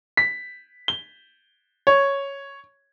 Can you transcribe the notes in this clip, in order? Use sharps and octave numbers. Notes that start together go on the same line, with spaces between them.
B6
G7
C#5